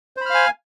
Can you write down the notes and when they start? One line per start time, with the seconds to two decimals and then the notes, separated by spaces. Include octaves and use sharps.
0.17 C5
0.21 B5
0.26 F6
0.30 F5
0.35 G#5